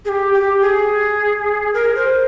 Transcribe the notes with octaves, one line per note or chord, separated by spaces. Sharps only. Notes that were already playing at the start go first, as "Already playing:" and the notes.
G#4
G4
G4
G#4
A#4
C5